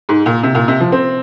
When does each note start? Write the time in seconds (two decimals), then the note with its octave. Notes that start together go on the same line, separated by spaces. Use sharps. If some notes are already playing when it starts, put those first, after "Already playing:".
0.09 G#2
0.26 A#2
0.43 C3
0.55 A#2
0.68 C3
0.80 F3
0.92 C4